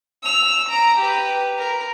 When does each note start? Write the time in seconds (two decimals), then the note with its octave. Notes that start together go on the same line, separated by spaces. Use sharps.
0.23 E6 F7
0.69 A#5 D7
0.99 G4 B4
1.59 A#4